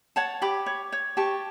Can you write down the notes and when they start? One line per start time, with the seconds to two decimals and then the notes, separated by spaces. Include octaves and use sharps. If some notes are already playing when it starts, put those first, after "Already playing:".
0.16 C#5 F#5 A5
0.42 G4 B5 D6
0.66 C#5
0.92 C#5
1.17 G4 A5 C#6